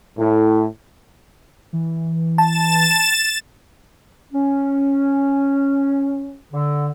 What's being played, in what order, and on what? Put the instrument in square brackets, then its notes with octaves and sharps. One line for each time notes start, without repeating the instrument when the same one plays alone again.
[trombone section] A2
[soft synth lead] E3
[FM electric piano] A5 [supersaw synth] A6 E7
[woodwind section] C#4
D3